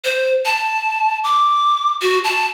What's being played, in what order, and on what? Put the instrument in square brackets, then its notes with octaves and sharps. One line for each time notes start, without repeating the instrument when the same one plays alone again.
[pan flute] C5
A5
D6
F#4
A5